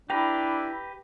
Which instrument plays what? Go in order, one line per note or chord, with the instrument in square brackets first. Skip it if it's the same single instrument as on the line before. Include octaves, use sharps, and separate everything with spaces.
[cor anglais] D4 [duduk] E4 [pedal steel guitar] G4 B4 A#5 [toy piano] G5